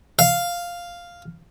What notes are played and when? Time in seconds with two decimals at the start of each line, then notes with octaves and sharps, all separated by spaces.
0.19 F5